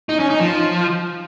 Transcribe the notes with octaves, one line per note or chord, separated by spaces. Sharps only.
D#4
C#4
D#4
F3